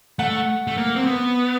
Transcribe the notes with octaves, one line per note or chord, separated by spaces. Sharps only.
A3 F#5
A3
A#3
C4
B3